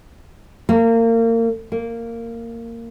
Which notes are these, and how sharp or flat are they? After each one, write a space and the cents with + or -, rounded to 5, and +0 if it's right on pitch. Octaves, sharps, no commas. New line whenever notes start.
A#3 -30
A#3 -15